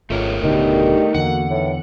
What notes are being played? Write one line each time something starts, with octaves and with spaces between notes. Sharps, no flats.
G#1 C#2 A3 A#4 C#5
D1 B2 D3 D#3 D4 F#4 G4
E2 D3 A#3 F#4 F#5
A2 D#3 E3